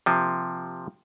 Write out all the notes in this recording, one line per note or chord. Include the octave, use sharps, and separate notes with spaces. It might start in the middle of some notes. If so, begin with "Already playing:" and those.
C3 F3 A#3